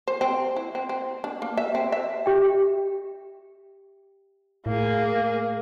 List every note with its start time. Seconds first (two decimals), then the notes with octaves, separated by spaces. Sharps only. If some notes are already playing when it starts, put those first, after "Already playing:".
0.08 C5
0.21 C4
0.56 E4
0.75 C4
0.89 C4
1.24 D4
1.42 A#3
1.57 E5
1.75 C4
1.92 E5
2.26 G4 E5 G5
4.66 A2 A#3 G#4